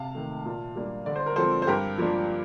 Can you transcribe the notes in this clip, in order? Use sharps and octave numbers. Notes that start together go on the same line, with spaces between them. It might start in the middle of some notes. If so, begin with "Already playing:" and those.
Already playing: C3 F5 A5
D#3 A3
A#2
G3 A#3 D4
D3 D5
C5
A#4
F3 C4 A4 C5
C5
G2 G4 A#4
F3 A#3 D4